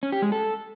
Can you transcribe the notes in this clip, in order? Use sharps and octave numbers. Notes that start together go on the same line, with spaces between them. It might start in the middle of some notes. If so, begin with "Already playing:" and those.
C#4
G4
G#3
A4